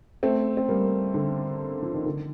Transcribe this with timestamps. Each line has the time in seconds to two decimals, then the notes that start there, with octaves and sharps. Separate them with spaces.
0.23 A3 C4
0.57 C4
0.69 G3 A#3
1.14 D3
1.83 F3
1.94 D#3
2.06 D3